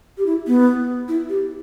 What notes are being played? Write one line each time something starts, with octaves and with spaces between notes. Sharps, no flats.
G4
E4
B3
E4
G4